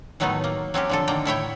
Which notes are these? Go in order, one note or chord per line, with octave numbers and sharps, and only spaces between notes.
A2 D#3 F#3 A3 B3 D#4
A#3
F#3 C4 C#4 G4
D3 F3 A4
D3 D#3 A#3 G5 A#5
A2 E4 C#5 G5